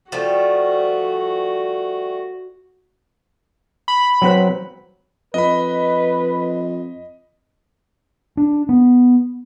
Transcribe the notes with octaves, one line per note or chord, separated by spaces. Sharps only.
F3 G3 A3 F#4
B5
F#3 C4 B4
F2 B4 D#5 B5
D4
B3